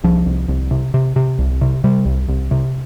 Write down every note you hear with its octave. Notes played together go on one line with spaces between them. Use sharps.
C2 F3
C2
C2
C3
C3
C3
C2
C3
C3 G3
C2
C2
C3